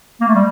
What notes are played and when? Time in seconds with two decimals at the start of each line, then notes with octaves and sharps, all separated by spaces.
0.21 A#3
0.28 A3
0.35 G3